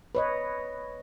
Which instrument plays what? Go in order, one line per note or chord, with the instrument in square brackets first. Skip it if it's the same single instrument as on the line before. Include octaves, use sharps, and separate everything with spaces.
[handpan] B4 C#5 D#5